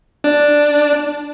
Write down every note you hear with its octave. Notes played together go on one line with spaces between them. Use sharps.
D4